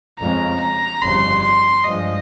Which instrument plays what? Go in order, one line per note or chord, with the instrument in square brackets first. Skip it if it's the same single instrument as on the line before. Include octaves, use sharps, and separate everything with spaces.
[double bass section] F2 C#3 G#3 C#4 [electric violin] A#5
[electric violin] A#5
[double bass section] G1 F2 C#3 G3 [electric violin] C6
[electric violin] C6
[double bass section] G2 F3 G#3 [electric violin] D#5